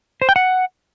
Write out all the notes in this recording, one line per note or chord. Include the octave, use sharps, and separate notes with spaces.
C5
G5
F#5